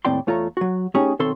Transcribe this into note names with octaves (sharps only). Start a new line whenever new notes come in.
D#2 A2 C4 D5 G5 C6
E2 A3 F4 A4 C#5 A#5
F#3 F#4
A3 C#4 D#4 G4 G#4
B1 D#3 C4 A4 C#5 C6